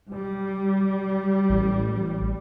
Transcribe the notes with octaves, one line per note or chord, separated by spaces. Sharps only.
G3
A1